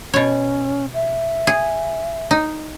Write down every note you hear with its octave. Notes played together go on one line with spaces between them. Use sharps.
B2 C#4 C#5
E5
G#4
D#4